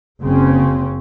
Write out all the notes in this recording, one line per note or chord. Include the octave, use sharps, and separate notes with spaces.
F#1 C#3 C4 C#4